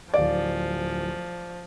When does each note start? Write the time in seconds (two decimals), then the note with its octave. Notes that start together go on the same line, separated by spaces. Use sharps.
0.14 D1 F3 D5 F5